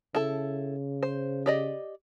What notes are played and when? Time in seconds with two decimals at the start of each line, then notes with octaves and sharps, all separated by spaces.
0.15 C#3 E4 A4
1.03 C5
1.46 G4 D5 D#5